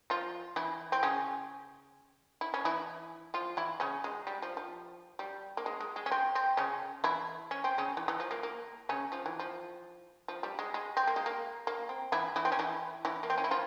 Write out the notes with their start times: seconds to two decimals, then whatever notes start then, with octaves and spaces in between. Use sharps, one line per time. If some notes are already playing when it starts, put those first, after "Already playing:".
0.10 F3 F4
0.56 E3 E4
0.92 C4
1.03 C#3 C#4
2.41 E4
2.54 C#4
2.65 E3 E4
3.34 F3 F4
3.57 E3 E4
3.80 C#3 C#4
4.04 G#3
4.27 G3
4.42 F3
4.57 F3
5.19 G3
5.57 A#3
5.66 G#3
5.80 G#3
5.96 G#3
6.06 C#4
6.11 C4
6.35 C4
6.57 C#3 C#4
7.04 E3 E4
7.51 C#4
7.64 C4
7.78 C#3 C#4
7.97 E3
8.08 E3
8.20 F3
8.31 A#3
8.43 A#3
8.89 C#3 C#4
9.12 F3
9.26 E3
9.39 F3
10.28 F3
10.43 G3
10.59 G#3
10.74 G#3
10.97 C4
11.07 A#3
11.16 G#3
11.26 A#3
11.67 A#3
11.89 C4
12.12 E3 E4
12.36 E3 E4
12.45 C4
12.52 C#4
12.59 E3 E4
13.05 E3 E4
13.23 A#3
13.30 C4
13.38 C#4
13.44 E4
13.51 F3 F4